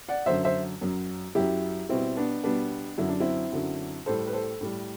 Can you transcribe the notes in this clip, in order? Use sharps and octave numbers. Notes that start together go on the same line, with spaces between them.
D5 F#5
F#2 D3 F#3 C5 E5
C5 E5
F#2 F#3
F#2 F#3 E4 G4
B2 G3 C4 E4
B3 D4
B2 G3 B3 D4
F#2 D3 F#3 E4
D4
C4 E4
F#2 D3 F#3
A2 G3 A4 C5
B4
A4 C5
A2 G3